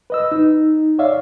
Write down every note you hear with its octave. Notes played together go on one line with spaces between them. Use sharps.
B4 D#5 E6
D#4
C#5 D5 E5 F5